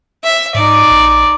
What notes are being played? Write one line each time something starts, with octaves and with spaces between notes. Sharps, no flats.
E5
G#2 D#4 D5
A#1